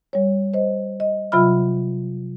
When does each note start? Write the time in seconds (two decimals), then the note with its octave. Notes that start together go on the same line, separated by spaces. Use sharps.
0.13 G3 C#5
0.54 C5 D#5
1.00 D#5
1.32 C3 F#3 F4 E5 B5 F6